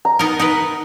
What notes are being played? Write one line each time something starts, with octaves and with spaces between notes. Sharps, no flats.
A#5
B3 D#4 A#4
D#4 A#4 B4